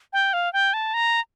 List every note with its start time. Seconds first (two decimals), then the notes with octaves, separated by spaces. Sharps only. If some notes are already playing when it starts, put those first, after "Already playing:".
0.13 G5
0.33 F5
0.53 G5
0.74 A5
0.94 A#5